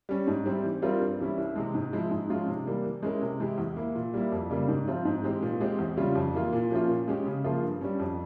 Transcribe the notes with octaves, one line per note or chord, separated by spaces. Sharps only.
G3 C#4
G#2
G3 C4 E4 G4
E3
G3 C4 F4 A#4
G2
E3 G3 C#4 E4
C2
C3 E3 G#3
G#2
F3 G#3 E4
G#2
F3 G#3 C#4 F4
C3
E3 G3 A#3
E3
G#3 C#4 E4 A#4
C3
E3 G#3 E4 G4
E2
E3 A#3 E4
A#2
G3 A#3 E4
F2
C#3 G3 A#3
G#2
F3 C4 F4
G#2
E3 G#3 C4 G4
A#2
G#3 C4 G4
E2
C#3 G3 C#4 F4
F2
E3 A#3 F4
A#2
F3 A#3 C#4 F4
A#2
G#3 C#4 G4
C#3
F3 A#3 F4 G#4
G2
G3 C#4
F2